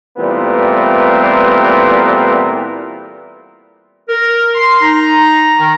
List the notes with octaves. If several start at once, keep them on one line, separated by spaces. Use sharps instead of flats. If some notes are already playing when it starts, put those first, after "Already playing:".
A#2 E3 G3 A3 B3 C4
A#4
C6
D#4 A#5
D#3